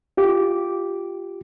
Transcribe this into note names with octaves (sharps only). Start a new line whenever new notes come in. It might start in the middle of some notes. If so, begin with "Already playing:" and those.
F4 G4 D6